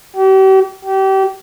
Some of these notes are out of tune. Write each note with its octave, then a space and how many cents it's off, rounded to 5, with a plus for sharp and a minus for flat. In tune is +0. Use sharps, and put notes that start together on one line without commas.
G4 -40
G4 -30